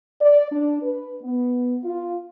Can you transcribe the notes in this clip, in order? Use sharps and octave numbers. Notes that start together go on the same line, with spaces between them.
D5
D4
B4
B3
F4